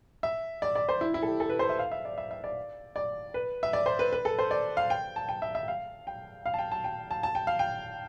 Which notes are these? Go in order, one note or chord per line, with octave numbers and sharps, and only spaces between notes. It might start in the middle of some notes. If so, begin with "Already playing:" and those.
E5
D5
D5
C5
E4
E4
A4
G4
A4
B4
C5
E5
F5
E5
D5
E5
E5
D5
D5
B4
E5
D5
C5
B4
B4
A4
C5
D5
F5
G5
A5
G5
E5
E5
F5
G5
F5
A5
G5
A5
G5
A5
A5
G5
F5
G5